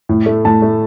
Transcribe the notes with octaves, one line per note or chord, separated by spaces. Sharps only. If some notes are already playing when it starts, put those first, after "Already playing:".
A2
A3
A2 A5
A3